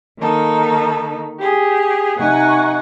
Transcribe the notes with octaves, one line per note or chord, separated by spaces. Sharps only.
D#3 A#3 D#4 A4
G4 G#4
C3 D#4 F#5 G#5 C#6